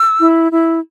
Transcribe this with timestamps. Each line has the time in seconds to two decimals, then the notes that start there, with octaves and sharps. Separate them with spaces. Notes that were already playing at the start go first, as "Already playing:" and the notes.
Already playing: E6
0.20 E4
0.51 E4